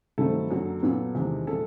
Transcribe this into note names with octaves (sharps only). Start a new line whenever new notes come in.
G2 D#3 F#3 A3 C4 A4
F#2 D3 F#3 A#3
A#2 F#3 B3
E2 C3 D#3 G#3
A#2 F3 G#3 A4